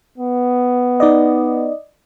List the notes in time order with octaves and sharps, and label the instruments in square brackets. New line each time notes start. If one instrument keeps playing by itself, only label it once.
[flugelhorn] B3
[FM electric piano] D#4 D5 D#5